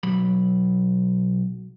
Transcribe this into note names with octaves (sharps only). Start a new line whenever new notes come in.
B1 F#3 B5